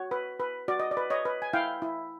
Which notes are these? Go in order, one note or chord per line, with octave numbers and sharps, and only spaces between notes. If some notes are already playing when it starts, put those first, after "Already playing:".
Already playing: F#4 C#5
B4
B4
F#4 D5
D#5
D5
B4
C#5 D#5
B4
G#5
E4 F5 G5
E4